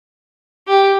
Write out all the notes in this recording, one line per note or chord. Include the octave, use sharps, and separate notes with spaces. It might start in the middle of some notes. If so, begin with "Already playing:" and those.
G4